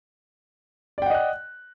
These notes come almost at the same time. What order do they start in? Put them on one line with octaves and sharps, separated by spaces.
D5 G5 F#5 D#5 F#6